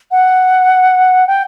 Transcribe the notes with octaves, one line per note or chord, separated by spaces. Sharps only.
F#5
G5